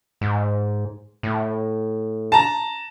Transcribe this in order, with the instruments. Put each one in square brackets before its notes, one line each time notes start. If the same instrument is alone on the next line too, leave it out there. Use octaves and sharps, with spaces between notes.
[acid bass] G#2
A2
[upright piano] A5 A#5